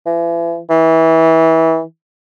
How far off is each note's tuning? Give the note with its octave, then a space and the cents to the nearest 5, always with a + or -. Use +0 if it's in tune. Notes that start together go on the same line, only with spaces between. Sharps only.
E3 +40
E3 -25